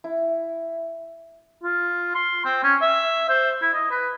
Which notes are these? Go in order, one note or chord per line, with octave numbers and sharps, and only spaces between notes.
E4
F4
C6
C4
C#4
E5
C5
E4
D#5
B4